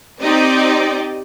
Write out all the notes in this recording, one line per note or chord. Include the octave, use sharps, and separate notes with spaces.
C4 D#4 G4 D5 D#5 G5